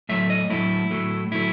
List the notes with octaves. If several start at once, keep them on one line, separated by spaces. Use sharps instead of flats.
A2 F#3 A3 E5
D#5
A2 F#3 A3 E4
A2 F#3 A3
A2 F#3 A3 E4